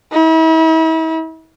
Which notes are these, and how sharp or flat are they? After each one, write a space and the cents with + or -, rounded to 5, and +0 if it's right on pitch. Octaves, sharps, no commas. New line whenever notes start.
E4 -40